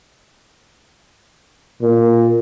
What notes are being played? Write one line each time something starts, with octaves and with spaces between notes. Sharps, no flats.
A#2